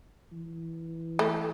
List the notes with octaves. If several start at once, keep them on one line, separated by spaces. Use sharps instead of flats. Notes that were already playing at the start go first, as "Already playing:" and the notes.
E3
A3